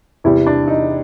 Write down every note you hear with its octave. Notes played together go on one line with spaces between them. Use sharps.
E2 C3 E3 G3 E4
D4
D#4